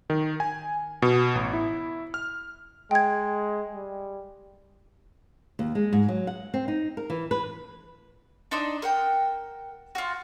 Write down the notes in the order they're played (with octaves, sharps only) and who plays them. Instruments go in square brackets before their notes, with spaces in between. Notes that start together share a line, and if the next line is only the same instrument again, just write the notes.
[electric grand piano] D#3
G#5
B2
A1
E4
F6
[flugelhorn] G#3 [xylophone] G5 G#6
[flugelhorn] G3
[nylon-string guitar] D#2
G#3
G#2
F#3
F#5
C4
D#4
A#4
E3
B4
[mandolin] D4 D#4 C5 D5
A#4 F#5 G5
F4 F#4